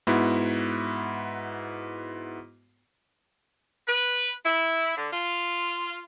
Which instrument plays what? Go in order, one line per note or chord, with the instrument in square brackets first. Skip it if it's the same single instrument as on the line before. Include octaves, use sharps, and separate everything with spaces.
[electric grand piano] G#2 B3 E4 F#4
[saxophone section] B4
E4
D3
F4